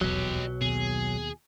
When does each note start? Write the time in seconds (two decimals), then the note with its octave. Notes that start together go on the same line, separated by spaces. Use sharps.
0.01 D#1 B1 E2 F#3 G4 D#5
0.61 D#2 B2 G#4